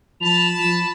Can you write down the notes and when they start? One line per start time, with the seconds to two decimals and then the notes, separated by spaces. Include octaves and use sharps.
0.21 F3 A5 B5 F7
0.59 F3 E7